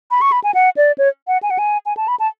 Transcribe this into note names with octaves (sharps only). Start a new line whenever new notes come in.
B5
C#6
B5
G#5
F#5
D5
C#5
F#5
G#5
F#5
G#5
G#5
A5
B5
A5